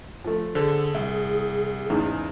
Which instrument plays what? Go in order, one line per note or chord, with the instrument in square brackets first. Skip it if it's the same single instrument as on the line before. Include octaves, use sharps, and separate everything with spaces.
[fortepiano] F3 A3
[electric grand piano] D3 A4 [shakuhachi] G#4 [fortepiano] C5
[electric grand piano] C2 [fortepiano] E5
[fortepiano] E2 G#2 [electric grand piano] C#3